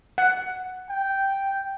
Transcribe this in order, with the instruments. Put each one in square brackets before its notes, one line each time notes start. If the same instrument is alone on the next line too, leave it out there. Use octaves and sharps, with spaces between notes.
[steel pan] F#5
[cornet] G5